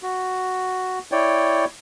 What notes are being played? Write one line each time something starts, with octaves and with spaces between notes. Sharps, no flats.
F#4
E4 C#5 D5 G5